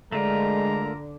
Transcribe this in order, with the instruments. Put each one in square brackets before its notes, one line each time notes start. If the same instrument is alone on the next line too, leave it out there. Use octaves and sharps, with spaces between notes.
[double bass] D3 D4 [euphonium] G#3 [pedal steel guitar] A3 F4 A#4 [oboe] A#5